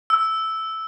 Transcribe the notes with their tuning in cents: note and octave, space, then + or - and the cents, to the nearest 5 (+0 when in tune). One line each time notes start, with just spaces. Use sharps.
E6 -5